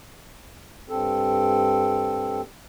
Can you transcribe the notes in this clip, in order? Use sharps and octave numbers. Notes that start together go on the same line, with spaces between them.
G2 C4 A4